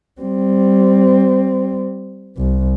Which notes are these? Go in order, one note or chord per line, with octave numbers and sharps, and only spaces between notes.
G3 C4
C2